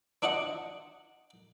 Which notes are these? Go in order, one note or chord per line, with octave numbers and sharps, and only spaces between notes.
C4 D4 F#4 D#5 F#5